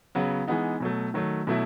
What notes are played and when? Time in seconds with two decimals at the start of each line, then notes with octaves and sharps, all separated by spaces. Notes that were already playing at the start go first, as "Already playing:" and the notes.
0.15 C#3 F#3 B3
0.48 E3 G#3 B3 D#4
0.80 B2 F#3 A3
1.14 D#3 F#3 A3
1.47 B2 F#3 A3 E4